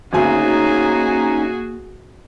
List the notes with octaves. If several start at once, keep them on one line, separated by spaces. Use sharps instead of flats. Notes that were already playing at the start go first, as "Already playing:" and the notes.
G#1 D2 A#3 C#4 D#4 F#4 G#4 G#5